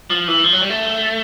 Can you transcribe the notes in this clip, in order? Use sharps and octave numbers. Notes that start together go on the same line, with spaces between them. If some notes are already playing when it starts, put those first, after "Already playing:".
F3
E3
F3
F#3
G3
A3